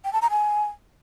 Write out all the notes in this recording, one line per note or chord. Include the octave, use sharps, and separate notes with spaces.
G5
A5
A#5
G#5